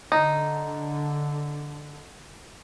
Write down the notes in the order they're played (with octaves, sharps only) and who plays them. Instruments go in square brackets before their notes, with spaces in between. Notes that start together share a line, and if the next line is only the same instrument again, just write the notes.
[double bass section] D3 [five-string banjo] D#4